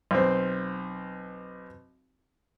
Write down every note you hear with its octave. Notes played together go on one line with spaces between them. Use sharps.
B1 C4